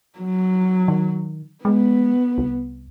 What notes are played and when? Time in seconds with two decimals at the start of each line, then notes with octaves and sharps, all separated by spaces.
0.19 F#3
0.88 D#3
1.65 G#3 B3
2.38 C2